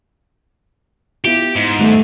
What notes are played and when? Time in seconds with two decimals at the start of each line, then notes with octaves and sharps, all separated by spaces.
1.24 B3 E4 F4 G4
1.56 G#2
1.79 D#3 G3 A3 B3